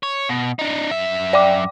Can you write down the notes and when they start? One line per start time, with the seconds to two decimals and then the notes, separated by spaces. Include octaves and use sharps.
0.03 C#5
0.29 B2
0.59 D4 D#4
0.91 F#2 E5
1.33 D5 G5 D6